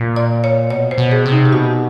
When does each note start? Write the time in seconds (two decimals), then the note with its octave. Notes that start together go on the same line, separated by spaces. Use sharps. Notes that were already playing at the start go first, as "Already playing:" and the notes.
Already playing: A#2
0.16 D5
0.44 C#5
0.70 B2 C#5
0.91 C5
0.98 B2
1.12 G#4
1.26 C3
1.32 D#4
1.45 G4
1.52 B2 F#4